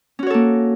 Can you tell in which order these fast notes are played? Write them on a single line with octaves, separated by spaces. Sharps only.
C#4 F#4 C#5 A4 A#3